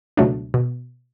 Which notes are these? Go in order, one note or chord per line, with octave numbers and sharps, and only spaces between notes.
C#2 B2 F#3 A3 D4
B2